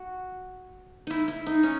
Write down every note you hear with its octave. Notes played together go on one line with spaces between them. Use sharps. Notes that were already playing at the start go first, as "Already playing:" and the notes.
Already playing: F#4
D#4 E4
E4
D#4
C#4